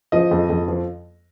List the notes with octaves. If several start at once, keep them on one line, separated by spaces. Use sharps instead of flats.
F3 D#5
F2
F2
F3